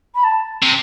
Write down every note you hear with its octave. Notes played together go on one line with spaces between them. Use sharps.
B5
A5
C3